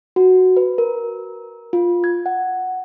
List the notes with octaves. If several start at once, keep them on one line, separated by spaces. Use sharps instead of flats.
F#4
B4
A#4
F4
G#6
F#5